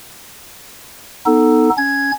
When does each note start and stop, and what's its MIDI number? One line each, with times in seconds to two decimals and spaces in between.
1.26 1.70 59
1.26 1.70 63
1.26 1.70 69
1.78 2.12 61
1.78 2.12 92